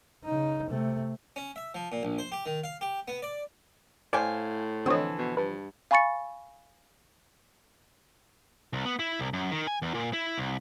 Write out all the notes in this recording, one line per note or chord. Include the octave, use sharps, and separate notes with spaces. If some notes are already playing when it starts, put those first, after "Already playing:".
C#3 D#4
C3 A3
C#4
E5
F3
A#2
A#1
C5
G4
D#3
F5
G4
B3
D5
A2 C5 D5 F5 G5 G#5
D3 E3 F3 C4 C#5 D#5
B2
G2 B4
F5 G#5 B5 C#6 A6 C#7
C2
B3
E4
C2
F#2
D#3
G#5
E2
A#2
E4
C2